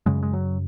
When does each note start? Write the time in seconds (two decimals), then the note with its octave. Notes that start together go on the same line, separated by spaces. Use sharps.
0.06 F#2 C#3 G#3
0.23 G#3
0.33 F#3